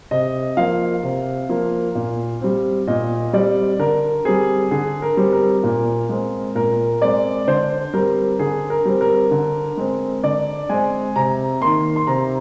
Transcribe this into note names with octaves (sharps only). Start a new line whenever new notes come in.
C3 D#5
F3 A#3 F5
C3
F3 A#3
A#2
G3 C4
A#2 D#5
G3 C4 D5
D3 A#4
G3 C4 G#4
D3 G#4
A#4
G3 C4
A#4
A#2
G#3 C4
A#2 A#4
G#3 C4 D5
D3 C5
G3 C4 A#4
D3 G#4
A#4
G3 C4
A#4
D3
G#3 C4
D3 D5
G#3 C4 G#5
C3 A#5
D#3 A#3 C6
C6
C3 A#5